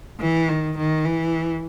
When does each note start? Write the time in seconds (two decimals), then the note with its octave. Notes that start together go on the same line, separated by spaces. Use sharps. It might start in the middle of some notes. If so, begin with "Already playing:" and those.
0.20 E3
0.49 D#3
0.78 D#3
1.05 E3